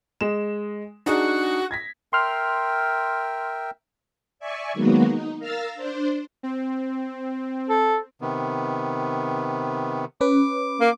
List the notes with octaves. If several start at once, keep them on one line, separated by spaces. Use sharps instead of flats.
G#3 E7
D4 D#4 F#4 G#4
G#6 A#6 B6
A#4 E5 G5 C6 F6
D5 E5 G#5 C#6
D#3 F#3 G#3 A#3 B3 F#4
D#4
A#4 F5 A#5 E6 F6 A6
D4 C5
C4
A4
C3 D#3 B3
C#4 B4 D6
A#3